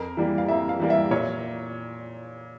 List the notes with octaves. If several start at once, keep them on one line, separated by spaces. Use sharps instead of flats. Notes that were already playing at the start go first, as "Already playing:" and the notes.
Already playing: F2 A#4
E3 G3 A#3
F5
F2 E5
F5
E3 G3 A#3
E5
A#2 C#5